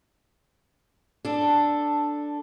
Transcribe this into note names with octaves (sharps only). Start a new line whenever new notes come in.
D4 A4